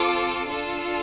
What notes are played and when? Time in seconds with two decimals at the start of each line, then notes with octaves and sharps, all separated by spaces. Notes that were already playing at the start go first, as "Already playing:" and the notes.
Already playing: C4 F4 A4 D6
0.50 D4 F4 A4